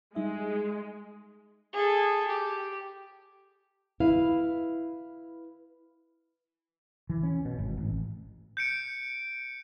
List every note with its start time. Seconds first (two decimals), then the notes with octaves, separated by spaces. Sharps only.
0.15 G3 G#3 D#4 E5
1.72 G#4 A4
2.27 G4
4.00 E4 B4 F5
7.10 E3
7.23 C#4
7.45 B2
7.58 G#1
7.77 A1
8.57 G6 C#7 D7